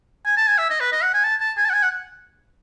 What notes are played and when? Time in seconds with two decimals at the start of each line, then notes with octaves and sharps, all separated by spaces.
0.26 G#5
0.37 A5
0.47 G#5
0.58 E5
0.70 D#5
0.80 B4
0.92 D#5
1.03 F#5
1.14 G#5
1.24 A5
1.40 A5
1.57 G#5
1.65 A5
1.70 F#5
1.74 G#5
1.83 F#5